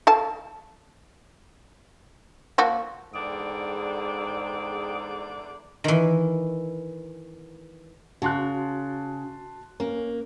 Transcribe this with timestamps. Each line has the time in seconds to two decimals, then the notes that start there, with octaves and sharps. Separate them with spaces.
0.07 A4 F5 A5
2.58 F3 A#3 F#4
3.14 E2 G#2 D3 G#4 D5 G5
5.84 D#3 E3
8.22 C#3 F#4 A5 C6 F#6
9.80 A#3 C#4 A#4